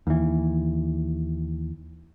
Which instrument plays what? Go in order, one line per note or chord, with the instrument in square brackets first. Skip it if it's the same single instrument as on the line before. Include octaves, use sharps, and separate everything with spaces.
[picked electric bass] D#2 E3